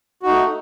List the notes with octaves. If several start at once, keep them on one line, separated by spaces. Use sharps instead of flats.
A3 D#4 F#4